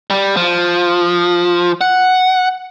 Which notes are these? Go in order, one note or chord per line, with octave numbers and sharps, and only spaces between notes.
G3
F3
F#5